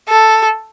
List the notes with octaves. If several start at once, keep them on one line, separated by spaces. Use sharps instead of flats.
A4